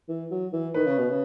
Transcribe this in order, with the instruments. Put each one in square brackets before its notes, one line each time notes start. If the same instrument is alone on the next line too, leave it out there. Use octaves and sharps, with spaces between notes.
[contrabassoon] E3
F#3
E3
[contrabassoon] D#3 [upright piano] B4
[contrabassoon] C#3
B2
C#3